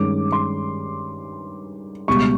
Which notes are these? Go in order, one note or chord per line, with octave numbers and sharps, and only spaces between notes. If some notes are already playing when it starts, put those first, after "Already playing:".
Already playing: G2 D#3 G#3 C#4 D6
C6
C#2 B2 G3 C#6